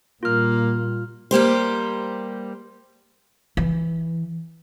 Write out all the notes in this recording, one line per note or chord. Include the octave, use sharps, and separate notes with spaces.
A#2 G3 A#3 F4 F6
G3 A#3 G4 C5
E3